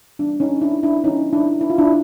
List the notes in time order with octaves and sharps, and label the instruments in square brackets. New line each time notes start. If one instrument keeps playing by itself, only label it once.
[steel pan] E3 G3 B3 D4
C#4 D#4
D4 E4
D4 E4
E3 G3 B3 C#4 D#4
D4 E4
E4
F4
D4 E4